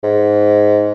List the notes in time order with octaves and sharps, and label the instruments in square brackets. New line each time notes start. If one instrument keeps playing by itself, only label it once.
[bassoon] G#2